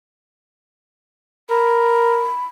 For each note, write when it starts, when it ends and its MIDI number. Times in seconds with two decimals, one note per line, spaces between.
1.50 2.29 70
1.50 2.45 83